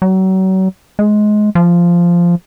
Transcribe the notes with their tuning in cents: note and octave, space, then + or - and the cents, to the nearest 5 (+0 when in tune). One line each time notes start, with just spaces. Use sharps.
F#3 +35
G#3 +20
F3 -10